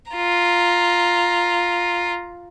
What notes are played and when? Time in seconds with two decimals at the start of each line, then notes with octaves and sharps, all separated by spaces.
0.12 F4 A#5